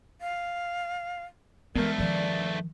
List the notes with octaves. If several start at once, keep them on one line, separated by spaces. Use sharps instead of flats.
F5
G2 E3 G#3 A3 B3 A#4
D#3 F3 D5